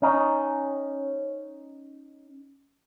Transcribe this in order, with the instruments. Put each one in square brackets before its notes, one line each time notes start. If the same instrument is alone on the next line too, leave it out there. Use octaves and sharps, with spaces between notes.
[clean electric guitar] C#4 D#4